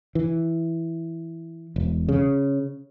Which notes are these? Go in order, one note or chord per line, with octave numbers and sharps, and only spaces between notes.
E3
E1
C#3